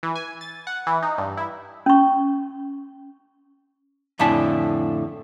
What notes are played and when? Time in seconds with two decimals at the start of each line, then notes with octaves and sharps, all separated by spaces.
0.03 E3
0.16 G#5
0.41 A6
0.67 F#5
0.87 E3
1.02 D#4
1.18 G2
1.37 E4
1.86 C#4 C#6
4.19 F2 A2 D3 G#5 A5 B5